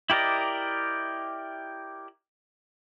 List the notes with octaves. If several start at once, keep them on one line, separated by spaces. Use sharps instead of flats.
E4 G4 A#4 D5 D#5